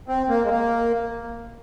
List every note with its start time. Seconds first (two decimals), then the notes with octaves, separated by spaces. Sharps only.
0.08 C4
0.29 A#3
0.44 G#3
0.49 A#3